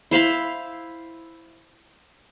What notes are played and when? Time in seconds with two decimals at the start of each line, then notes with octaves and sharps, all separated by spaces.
0.11 E4 C5 F5 B5